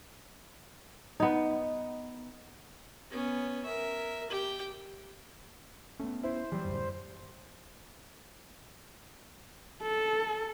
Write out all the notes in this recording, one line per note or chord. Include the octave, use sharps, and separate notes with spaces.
B3 D#4
B3 C#4
A#4 E5
G4 G5
A3 B3 C#4
E4 C5
E3 F#3 G3
D1 F#2
A4